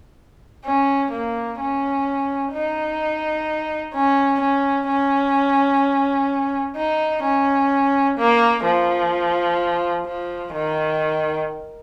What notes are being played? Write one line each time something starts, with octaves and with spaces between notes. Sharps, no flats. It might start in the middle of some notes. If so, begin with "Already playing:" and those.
C#4
A#3
C#4
D#4
C#4
C#4
C#4
D#4
C#4
A#3
F3
F3
D#3